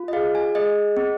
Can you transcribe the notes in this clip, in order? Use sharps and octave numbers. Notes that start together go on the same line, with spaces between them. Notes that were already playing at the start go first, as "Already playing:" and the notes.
Already playing: F4
D#5
G#4 F5
G#5
G#4 D#5
C4